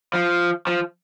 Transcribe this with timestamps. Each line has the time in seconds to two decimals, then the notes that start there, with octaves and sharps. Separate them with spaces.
0.14 F3
0.67 F3